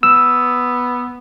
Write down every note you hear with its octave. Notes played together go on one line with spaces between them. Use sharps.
B3 E6